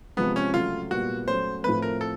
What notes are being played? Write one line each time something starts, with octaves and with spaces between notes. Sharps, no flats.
C3 F3 G#3 B3
C#4
C#3 F#3 A3 F4
A#2 G3 B3 F#4
F#3 A3 C#4 C5
A2 F3 A3 C4 B4
A#4
A4